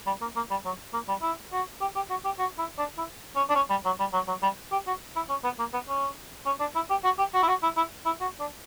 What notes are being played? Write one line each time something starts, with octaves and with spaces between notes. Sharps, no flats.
G3
A#3
A#3
G3
F#3
A#3
G3
E4
F#4
G4
G4
F#4
G4
F#4
E4
D4
E4
C#4
D4
C#4
G3
F#3
G3
F#3
F#3
G3
G4
F#4
E4
C#4
B3
A#3
B3
C#4
C#4
D4
E4
G4
F#4
G4
F#4
E4
F#4
E4
E4
E4
F#4
D4